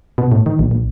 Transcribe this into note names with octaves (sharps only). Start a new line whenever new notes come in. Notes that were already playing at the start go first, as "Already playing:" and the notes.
B2
A2
D#3
A#1
A#1